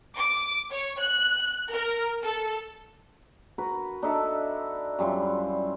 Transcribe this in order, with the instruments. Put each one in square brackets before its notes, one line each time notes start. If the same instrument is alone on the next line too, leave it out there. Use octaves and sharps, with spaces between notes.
[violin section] D6
C#5
F#6
A#4
A4
[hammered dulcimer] F#4 A#4 B4
D4 D#4 A4 E5
F#2 G3 E4 F4